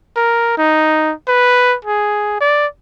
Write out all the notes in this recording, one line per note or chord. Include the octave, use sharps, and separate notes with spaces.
A#4
D#4
B4
G#4
D5